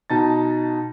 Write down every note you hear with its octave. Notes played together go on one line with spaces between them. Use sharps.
B2 D#4 A5 A6